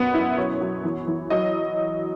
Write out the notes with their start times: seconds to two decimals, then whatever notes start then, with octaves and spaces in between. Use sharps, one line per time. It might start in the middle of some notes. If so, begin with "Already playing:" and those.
Already playing: F#2 B2 B3
0.14 F#2 E4
0.37 F#3 C#5
0.61 F#3
0.84 E3
1.07 E3
1.30 F#3 D#5